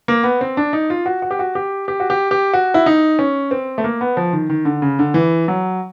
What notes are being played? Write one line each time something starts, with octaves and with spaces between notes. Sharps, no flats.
A#3
B3
C4
D4
D#4
F4
F#4
F#4
G4
F#4
G4
G4
F#4
G4
G4
F#4
E4
D#4
C#4
C4
A3
A#3
B3
F3
D#3
D#3
D3
C#3
D3
E3
F#3